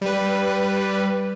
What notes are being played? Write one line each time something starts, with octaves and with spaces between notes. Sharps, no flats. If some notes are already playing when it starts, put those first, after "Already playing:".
G3 B4